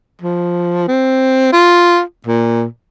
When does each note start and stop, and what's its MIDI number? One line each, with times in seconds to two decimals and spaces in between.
0.22 0.86 53
0.88 1.50 60
1.53 2.00 65
2.26 2.65 46